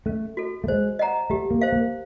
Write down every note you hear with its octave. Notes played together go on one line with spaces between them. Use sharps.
A3 C#4
F#4 A4
A3
G#3 C5
D#5 F#5 A#5
A3 G4
A#3
C5 F5
A#3